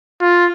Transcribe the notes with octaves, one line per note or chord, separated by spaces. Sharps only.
F4